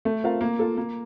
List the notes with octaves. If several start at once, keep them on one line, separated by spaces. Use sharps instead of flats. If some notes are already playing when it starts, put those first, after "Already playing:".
A3
C4 F4 A#4 F5
A#3
F4 A4
A#3